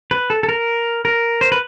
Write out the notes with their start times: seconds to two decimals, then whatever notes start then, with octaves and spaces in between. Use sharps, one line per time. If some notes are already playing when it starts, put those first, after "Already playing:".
0.11 B4
0.30 A4
0.43 A4
0.49 A#4
1.05 A#4
1.41 C5
1.52 B4